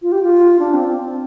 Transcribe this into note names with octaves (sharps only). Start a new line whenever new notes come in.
F4
G4
F4
D4
C4
C4